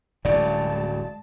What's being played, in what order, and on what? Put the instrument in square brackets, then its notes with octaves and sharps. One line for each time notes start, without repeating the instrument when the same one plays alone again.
[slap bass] D1 G2 C#3 [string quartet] G#3 A5 [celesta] D5